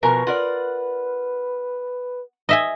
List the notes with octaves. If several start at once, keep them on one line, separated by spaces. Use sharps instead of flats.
B2 F3 A#4 B4 G#5 C#6
F4 A#4 D5 F#5
D#5 E5 G#5